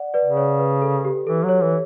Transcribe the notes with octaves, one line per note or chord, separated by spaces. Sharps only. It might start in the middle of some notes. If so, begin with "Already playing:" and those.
Already playing: D5 F#5
B4 D5
C#3
C#5
B4
A4
G4
E3 A4
F#3
C#5
E3